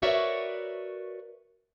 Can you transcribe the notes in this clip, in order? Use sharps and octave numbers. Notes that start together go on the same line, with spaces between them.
F#4 A#4 B4 C#5 D5 E5